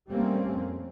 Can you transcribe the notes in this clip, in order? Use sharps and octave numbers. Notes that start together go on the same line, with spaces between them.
G3 A3 A#3 C4 C#4
F2